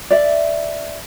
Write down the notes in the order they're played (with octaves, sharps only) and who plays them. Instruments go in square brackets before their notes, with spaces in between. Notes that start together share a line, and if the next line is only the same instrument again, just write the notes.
[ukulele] D5 E5